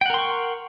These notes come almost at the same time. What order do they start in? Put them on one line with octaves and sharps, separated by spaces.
G5 F#5 A#4 C6 C#6